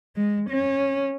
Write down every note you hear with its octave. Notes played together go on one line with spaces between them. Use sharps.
G#3
C#4